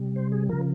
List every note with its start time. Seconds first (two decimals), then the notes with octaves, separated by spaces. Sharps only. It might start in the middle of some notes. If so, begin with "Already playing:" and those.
Already playing: C3 G3
0.16 C5
0.32 G#4
0.49 C#3 F3 A#4